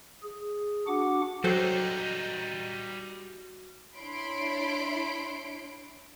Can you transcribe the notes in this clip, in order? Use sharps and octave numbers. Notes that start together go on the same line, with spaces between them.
G#4
D4 F#4 F#5 D6
F#3 G3 D#4 F#4 A4 C5 G5
D4 E4 C#5 B5 C6 D7